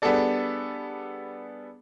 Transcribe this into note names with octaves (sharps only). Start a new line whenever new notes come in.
G3 B3 D4 G#4 A4 D5